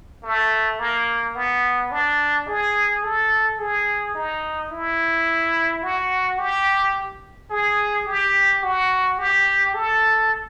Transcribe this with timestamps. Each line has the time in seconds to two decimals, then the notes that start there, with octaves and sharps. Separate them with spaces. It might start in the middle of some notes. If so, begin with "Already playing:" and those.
0.23 A3
0.79 A#3
1.35 B3
1.91 D4
2.47 G#4
3.03 A4
3.59 G#4
4.15 D#4
4.70 E4
5.83 F#4
6.39 G4
7.50 G#4
8.06 G4
8.63 F#4
9.18 G4
9.74 A4